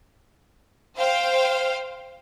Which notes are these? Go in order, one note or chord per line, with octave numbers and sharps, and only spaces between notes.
C5 F5 G5